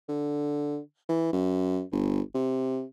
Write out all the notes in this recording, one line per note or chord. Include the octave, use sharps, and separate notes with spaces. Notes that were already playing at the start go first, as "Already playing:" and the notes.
D3
E3
F#2
G1
C3